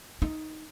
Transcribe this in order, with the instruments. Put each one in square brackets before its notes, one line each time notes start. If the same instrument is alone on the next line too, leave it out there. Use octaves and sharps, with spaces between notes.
[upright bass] D#4